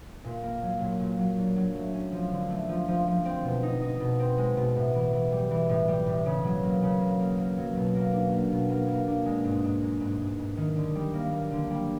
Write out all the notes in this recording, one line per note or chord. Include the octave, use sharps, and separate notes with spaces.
A#2
A#3
F#3
A#2
A#2
F#3
D4
F#3
A3
C#4
F3
D3
A3
F3
F3
F3
C4
B2
D#4
D#4
B2
C4
G#3
B2
A2
E3
E3
G3
E3
A2
G3
A2
C#3
F#3
A#3
C#3
A#3
A#3
A#3
F#3
B2
A#3
D4
A#3
B2
A#3
A#3
D4
G#3
G#2
G#2
G#3
G#2
G#2
G#2
D#3
D3
G3
A#3
A#3
D3
G3